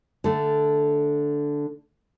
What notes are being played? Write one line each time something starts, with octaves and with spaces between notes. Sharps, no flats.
D3 A3